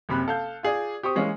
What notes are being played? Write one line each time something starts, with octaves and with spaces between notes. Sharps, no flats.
F#1 C3 B5 F#6
A4 F5 G6
F4 G#4 D5
G4 C5 C#6 D#6
E3 G#3 A#3 C#4